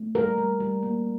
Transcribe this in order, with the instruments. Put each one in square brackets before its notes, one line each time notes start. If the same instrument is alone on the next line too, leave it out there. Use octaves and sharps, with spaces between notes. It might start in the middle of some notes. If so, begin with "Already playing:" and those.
Already playing: [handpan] A3
G3 A#4
G3
G3
A#3